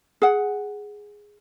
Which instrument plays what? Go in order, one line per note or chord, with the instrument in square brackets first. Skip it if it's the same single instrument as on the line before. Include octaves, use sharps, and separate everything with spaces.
[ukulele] G#4 F#5